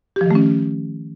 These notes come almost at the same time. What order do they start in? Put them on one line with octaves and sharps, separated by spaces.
G4 F3 D#3 A3 C#4